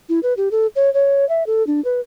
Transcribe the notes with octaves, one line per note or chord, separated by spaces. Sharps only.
E4
B4
G4
A4
C#5
C#5
E5
A4
D4
B4